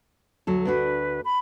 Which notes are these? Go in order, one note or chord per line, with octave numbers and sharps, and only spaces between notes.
D2 F#3 A4
D2 D4 F#4 B4
B5